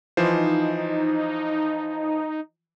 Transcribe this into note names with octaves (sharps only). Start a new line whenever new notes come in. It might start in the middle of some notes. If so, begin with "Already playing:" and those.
E3 F3 D#4 C5